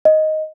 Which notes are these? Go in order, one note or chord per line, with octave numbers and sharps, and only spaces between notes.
D#5